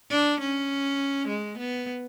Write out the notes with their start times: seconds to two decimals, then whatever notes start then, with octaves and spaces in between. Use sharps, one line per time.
0.11 D4
0.41 C#4
1.28 G#3
1.58 B3